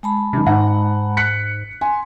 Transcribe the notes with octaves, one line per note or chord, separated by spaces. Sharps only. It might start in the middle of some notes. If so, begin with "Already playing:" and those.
G#3 A5 B5
F#2 C3 D#3
G#2 D#4 F#5
F#6 B6 C#7
G#5 C6